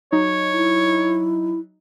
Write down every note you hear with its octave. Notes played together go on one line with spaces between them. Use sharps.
F#3 D#4 C#5
E4